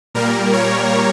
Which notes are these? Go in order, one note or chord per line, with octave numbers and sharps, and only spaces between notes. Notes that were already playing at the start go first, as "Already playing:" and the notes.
A#2 G3 A#3 A#4
C#5